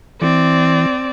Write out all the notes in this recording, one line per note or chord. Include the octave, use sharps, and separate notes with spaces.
E3 C4 D5